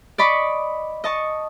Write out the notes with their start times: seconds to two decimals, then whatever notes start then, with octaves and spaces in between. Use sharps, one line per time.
0.18 D5 D#5 B5 C#6 D6
1.04 D#5 A5 C#6